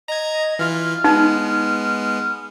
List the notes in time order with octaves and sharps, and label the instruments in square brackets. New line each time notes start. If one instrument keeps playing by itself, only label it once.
[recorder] D#5 [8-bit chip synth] A#5 G#6
[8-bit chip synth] E3 F4 [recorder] F6
[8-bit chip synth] G#3 B3 [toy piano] D#4